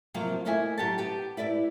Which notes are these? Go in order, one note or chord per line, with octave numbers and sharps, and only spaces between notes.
C3 F3 F#3 A#3 C4
A3 A#3 E4 D#5 E5 G#5
F#3 G4 F#5 A5
B3 G4
E4 B4 D5 E5